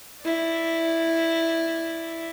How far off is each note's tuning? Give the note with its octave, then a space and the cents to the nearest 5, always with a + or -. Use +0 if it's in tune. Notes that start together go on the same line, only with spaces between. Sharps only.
E4 +0 D5 +0